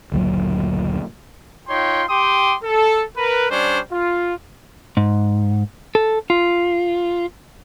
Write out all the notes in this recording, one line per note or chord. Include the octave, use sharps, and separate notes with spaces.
F#1 D2 A#2 F#3
D#4 F4 C#5 G5 C6
G4 G5 C6 D6 D#6
A4
A#4 B4
G3 C#4 D4 C5 C#5
F4
G#2
A4
F4